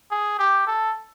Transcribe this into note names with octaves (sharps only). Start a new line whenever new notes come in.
G#4
G4
A4